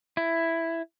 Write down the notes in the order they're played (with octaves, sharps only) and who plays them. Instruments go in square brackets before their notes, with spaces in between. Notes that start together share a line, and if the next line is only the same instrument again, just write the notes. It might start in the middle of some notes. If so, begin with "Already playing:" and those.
[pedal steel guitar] E4